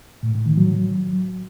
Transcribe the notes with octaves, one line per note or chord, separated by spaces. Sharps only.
A2
A2
D#3
F#3